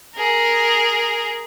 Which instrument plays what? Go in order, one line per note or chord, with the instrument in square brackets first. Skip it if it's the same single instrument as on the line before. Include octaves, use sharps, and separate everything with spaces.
[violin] G#4 A#4